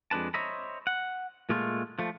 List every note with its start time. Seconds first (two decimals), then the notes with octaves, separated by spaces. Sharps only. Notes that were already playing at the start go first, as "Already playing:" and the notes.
0.11 F2 G#3 D4 B4 A5
0.34 C5 C#5 D#5 E5 A#5 B5
0.87 F#5
1.49 A#2 G#3 A3 F4
1.99 F3 A3